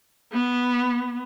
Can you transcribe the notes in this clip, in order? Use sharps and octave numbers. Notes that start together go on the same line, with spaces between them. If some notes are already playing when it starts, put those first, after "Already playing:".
B3